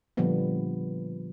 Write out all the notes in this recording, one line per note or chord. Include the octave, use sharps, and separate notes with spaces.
A#2 D3 F3 G3 B3